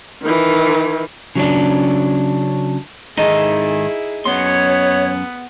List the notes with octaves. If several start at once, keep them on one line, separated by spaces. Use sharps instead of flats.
D#3 E3
C#3 F#3 C#4 D4
G#2 D#3 D#4 E4 G#4 A4
F#2 B3 C#5 C6